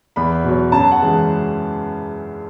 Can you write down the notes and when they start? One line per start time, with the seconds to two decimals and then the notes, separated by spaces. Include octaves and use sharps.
0.16 E2 B5
0.44 B2 F#3
0.72 F#2 A5
0.92 F#5
1.02 C#3 E3 G#3